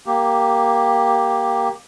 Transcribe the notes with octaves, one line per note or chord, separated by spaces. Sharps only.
A#3 G4